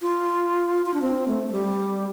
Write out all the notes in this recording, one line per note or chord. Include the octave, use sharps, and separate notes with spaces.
F4
F4
D4
C4
A3
A3
G3